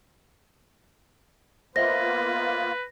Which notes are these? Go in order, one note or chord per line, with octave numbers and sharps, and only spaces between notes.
A#3 B3 F4 B4 C5 D#5 E5 A#6